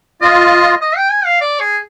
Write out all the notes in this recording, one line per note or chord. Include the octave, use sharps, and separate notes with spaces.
F4 D#5
D#5
G5
G#5
F5
D5
G#4